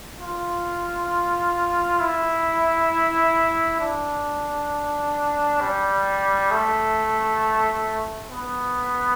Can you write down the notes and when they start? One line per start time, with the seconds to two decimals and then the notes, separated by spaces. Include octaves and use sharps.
0.21 F4
2.01 E4
3.80 D4
5.61 G3
6.51 A3
8.31 B3